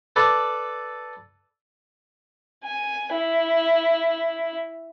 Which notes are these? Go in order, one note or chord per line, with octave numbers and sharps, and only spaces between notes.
A4 B4 D5
G#5
E4